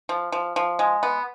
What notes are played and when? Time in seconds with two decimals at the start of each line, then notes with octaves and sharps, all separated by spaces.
0.09 F3
0.32 F3
0.56 F3
0.79 G#3
1.03 B3